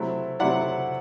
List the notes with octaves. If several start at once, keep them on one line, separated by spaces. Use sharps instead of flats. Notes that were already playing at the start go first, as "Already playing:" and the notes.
Already playing: C3 F#3 A3 C4 E4
C3 F#3 A3 C4 E4 D5 F#5